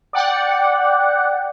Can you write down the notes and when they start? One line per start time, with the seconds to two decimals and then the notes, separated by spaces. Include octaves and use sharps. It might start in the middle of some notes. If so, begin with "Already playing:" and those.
0.13 D5 F#5 G5